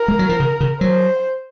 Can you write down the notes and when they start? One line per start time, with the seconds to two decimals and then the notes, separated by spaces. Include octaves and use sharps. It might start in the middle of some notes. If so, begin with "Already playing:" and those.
Already playing: A#4
0.08 G#3
0.19 F#3
0.29 F3
0.40 C#3
0.61 C#3
0.81 F#3 C5